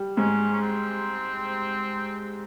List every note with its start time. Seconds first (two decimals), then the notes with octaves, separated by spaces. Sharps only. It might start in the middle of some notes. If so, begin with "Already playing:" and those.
Already playing: G3
0.17 G#2 G#3 C#4
0.53 C#4
0.61 C4